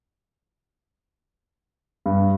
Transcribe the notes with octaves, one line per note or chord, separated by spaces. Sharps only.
G2